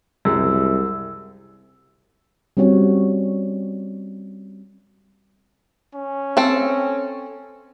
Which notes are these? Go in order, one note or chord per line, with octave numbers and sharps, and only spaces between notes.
C2 F#2 G#3 E6
G3 C4 C#4 F#4 C#5
C#4
C4 A4